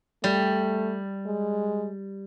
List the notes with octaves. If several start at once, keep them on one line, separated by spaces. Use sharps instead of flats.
G3 A3
G#3